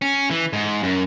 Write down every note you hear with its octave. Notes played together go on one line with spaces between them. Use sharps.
C#4
E3
G#2
F#2